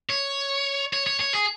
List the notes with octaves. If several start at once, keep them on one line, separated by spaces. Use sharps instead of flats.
C#5
C#5
C#5
C#5
G#4